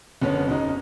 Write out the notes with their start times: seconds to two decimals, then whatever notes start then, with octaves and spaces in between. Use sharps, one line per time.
0.22 F#1 D3 B3 C#4 C#5
0.47 F#1 B1 C#3 D#4